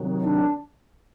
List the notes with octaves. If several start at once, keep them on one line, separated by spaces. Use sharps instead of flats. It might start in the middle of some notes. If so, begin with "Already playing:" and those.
Already playing: C3 D#3 F#3
D#4
D4